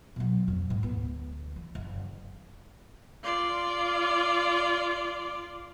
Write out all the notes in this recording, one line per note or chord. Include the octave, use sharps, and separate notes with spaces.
B2 F#3
F2
G#2
D2 B3
E3
F#1
F4 D5